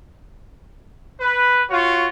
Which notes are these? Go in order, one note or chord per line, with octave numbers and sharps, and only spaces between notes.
B4
F4 F#4 C#5